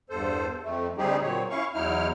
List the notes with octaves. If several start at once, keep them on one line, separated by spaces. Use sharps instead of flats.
E2 G2 A4 C5
F2 A3
D2 G3 C4 D#4 G4 G#4
A#2 F#3 C4 C#5
C#4 E4 F5 C#6
E2 F#3 D#4 E4 F6